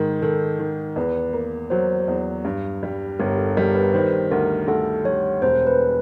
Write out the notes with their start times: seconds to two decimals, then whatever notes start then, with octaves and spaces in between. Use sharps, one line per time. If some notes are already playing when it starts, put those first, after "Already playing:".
Already playing: G#2 D#3
0.22 D#3 A4
0.59 D#3
0.96 E2 B4
1.33 A#3
1.70 F#3 C5
2.08 E2
2.45 G2
2.83 G3
3.19 G1 A#4
3.38 A4
3.56 G3 A#4
3.75 B4
3.93 D#3 C5
4.31 D2 A#4
4.67 D2 A4
5.05 G3 C#5
5.42 E1 C5
5.67 B4